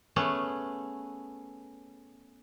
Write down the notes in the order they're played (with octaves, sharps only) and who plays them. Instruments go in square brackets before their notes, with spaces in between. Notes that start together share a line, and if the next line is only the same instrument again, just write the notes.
[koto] A3 B3 C#4 G#4